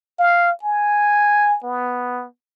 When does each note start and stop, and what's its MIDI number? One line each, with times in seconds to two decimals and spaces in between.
0.19 0.51 77
0.63 1.58 80
1.64 2.26 59